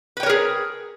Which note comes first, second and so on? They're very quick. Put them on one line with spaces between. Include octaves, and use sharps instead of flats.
B4 G5 C#5 A#4 G#4